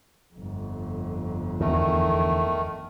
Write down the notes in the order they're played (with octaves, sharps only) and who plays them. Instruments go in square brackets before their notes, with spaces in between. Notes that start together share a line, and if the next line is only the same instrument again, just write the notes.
[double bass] G1 F2
[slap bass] E2 D3 [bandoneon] D#3 A3